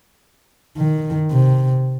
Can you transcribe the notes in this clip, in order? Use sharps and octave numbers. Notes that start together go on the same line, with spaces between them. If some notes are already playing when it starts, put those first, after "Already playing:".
D#3
C3